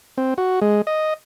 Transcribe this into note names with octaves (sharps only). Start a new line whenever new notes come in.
C4
F#4
G#3
D#5